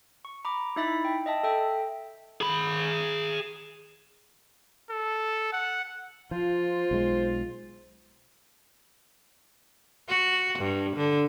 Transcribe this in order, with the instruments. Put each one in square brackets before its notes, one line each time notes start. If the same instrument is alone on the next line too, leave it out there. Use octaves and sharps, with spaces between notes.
[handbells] C#6
A#5 B5 D6
D#4 E4 E5 B5 A6 B6
G5
D#5 E5 A5
A4 E5 G5
[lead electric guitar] G#4 B5
[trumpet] A4
F#5
[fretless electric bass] F3 [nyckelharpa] F4 [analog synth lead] C5
[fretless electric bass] B1 G#3
[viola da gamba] F#4
G2
D3